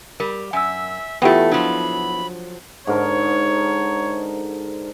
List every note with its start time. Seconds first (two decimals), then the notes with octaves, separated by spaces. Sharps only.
0.20 G3 A#4
0.53 F#2 E5 G#5 E6
1.22 E2 A3 B3 E4 F4 G4 G5
1.52 F3 F#3 D4 B5
2.87 G#2 D3 A#4 C#5